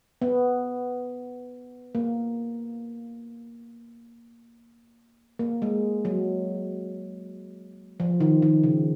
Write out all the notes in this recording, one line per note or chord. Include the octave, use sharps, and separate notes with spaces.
B3
A#3
A#3
G#3
F#3
F3
D#3
D#3
C#3